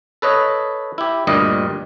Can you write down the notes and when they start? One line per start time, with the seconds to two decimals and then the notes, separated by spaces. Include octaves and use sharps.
0.22 A4 B4 C#5 D#5
0.98 E4 G4
1.27 D2 G2 A#2 G3 D#5